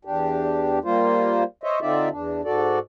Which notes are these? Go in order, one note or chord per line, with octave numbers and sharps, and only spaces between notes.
E2 D4 G4
G3 A#3 F4 C5
C5 C#5 D#5 E5
D3 C4 D#4 F4 D5 E5
E2 D4
G#2 F#4 A4 D5